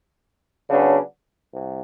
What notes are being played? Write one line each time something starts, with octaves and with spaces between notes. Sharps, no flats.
C#3 F#3 B3 D4
C2